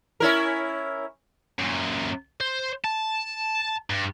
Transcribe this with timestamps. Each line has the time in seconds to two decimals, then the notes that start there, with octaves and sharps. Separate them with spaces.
0.20 C#4 E4 A#4
1.59 F#2 A#2
2.40 C5
2.84 A5
3.90 G2